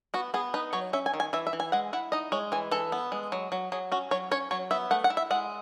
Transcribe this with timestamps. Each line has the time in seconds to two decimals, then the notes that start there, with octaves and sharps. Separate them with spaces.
0.14 B3 F#4
0.34 B3 G#4
0.54 D#4 B4
0.73 F#3 C#5
0.93 C#4 E5
1.06 G#5
1.14 D#3
1.20 G#5
1.33 E3 E5
1.47 E5
1.53 E3
1.60 G#5
1.72 G#3 F#5
1.93 E4 F#5
2.12 D#4 D#5
2.32 G#3 C#5
2.52 E3 G#5
2.71 E3 A4
2.92 B3
3.12 G#3
3.32 F#3
3.52 F#3
3.72 F#3 G#4
3.92 C#4 F#4
4.11 F#3 C#5
4.31 C#4 C#5
4.51 F#3 C#5
4.71 B3 E5
4.91 A3 F#5
5.04 F#5
5.10 E4
5.17 E5
5.31 G#3 F#5